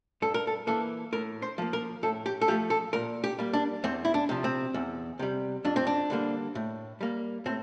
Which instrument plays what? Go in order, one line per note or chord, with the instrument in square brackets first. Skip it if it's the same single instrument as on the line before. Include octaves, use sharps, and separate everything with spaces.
[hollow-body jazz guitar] G2 A4
A#4
A4
E3 A#3 A4
A2 A#4
C5
F3 A#3
A#4
A2 A4
G4
A4
F3 A3 G4
A4
A#2 A#4
G4
G3 A#3
D4
E2 C4
E4
D4
C3 F3
C4
E2
C3 G3
F2 D4
C4
D4
D3 G3 A#3
A2
G3 A#3
A2 C4